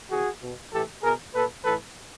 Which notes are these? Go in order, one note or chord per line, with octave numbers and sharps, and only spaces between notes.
C3 E3 F#4 G#4
B2
A2 E3 G4 A4
B2 G#4 A#4
A#2 A4 B4
A2 E3 A4 B4